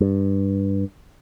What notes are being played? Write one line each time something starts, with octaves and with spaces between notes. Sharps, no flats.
G2